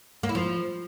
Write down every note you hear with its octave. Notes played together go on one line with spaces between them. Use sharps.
A#3
E4
F3